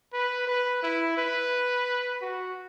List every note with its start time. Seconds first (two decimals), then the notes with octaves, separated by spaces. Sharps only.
0.13 B4
0.47 B4
0.83 E4
1.18 B4
2.22 F#4